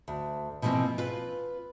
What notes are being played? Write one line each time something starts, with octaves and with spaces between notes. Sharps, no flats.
D2
B2 E3 F3 A3 A#3 C4
F4 B4